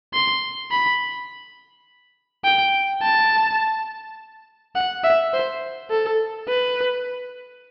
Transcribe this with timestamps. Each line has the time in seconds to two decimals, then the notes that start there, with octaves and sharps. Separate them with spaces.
0.14 C6
0.71 B5
2.44 G5
3.02 A5
4.75 F#5
5.04 E5
5.33 C5
5.91 A4
6.49 B4